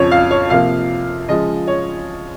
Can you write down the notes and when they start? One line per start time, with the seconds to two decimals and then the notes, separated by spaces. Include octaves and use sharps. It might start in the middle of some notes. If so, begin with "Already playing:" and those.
Already playing: F2 C#3 F3 C#5
0.11 F5
0.31 C#5
0.50 C3 F3 A#3 F5
1.29 C#3 F3 G#3 D#5
1.67 C#5